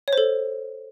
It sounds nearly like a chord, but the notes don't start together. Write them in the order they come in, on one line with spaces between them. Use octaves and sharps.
C#5 C5 A4